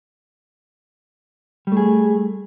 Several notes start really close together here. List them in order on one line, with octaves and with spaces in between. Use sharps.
G3 A3 G#4